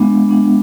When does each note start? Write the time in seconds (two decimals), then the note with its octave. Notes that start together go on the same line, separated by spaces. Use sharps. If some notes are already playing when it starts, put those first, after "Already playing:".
Already playing: G#3 B3 D4
0.28 G#3 B3 D4